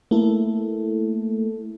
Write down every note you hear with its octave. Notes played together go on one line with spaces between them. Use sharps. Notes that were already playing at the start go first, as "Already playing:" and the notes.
A3 A#3 E4 A4